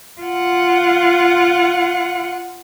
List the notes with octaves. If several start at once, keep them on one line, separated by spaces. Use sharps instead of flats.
F4 F#5